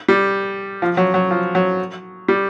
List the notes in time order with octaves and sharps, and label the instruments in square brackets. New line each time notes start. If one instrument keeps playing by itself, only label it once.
[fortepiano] G3
F3
F#3
F#3
F3
F#3
G3